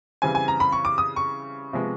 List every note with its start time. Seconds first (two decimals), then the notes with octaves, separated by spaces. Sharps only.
0.22 C#3 E3 G3 C4 G#5
0.35 G#5
0.48 A#5
0.60 B5
0.72 C#6
0.85 D6
0.98 D#6
1.16 C#6
1.73 C3 F3 G#3 B3